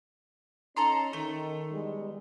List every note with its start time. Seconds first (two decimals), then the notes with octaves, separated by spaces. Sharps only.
0.77 C#4 D#4 A4 A#5 C6
1.13 D#3 A3
1.71 E2 G3 G#3